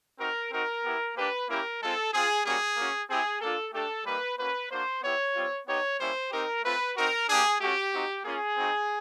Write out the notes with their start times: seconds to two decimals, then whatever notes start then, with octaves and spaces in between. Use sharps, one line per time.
0.19 C4 D#4 F#4 A#4
0.51 C4 D#4 F#4 A#4
0.84 B3 E4 G4
1.16 A#3 D4 G4 B4
1.48 A#3 C#4 E4 G4 A#4
1.81 G#3 C4 F4 A4
2.12 C4 F4 G#4
2.45 G3 A#3 C#4 F#4 G#4
2.77 A#3 C#4 F#4
3.09 C4 E4 G4 G#4
3.41 A#3 D4 F4 A4
3.73 A3 D4 G4 A4
4.05 G3 A#3 D#4 B4
4.37 A#3 C#4 F#4 B4
4.71 A#3 D4 F#4 C5
5.02 B3 E4 G4 C#5
5.35 G3 C4 F4
5.67 B3 D#4 G4 C#5
5.99 G3 A#3 C#4 E4 C5
6.31 C4 D#4 G4 A#4
6.63 A3 C4 F4 B4
6.95 C4 D#4 F#4 A#4
7.28 A#3 D4 G4 G#4
7.60 A3 C#4 F#4 G4
7.93 C4 D#4 F#4
8.24 A#3 C#4 F4 G#4
8.57 C4 D#4 F#4